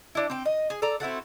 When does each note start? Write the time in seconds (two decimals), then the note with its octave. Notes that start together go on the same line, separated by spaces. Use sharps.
0.15 D4 E4
0.30 C4 G5
0.45 D#5
0.70 G#4
0.82 A4 D5 A#5
1.00 C4 E4 F#4 A4